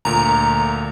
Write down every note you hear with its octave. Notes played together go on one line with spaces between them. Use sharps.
D2 A#2 A#5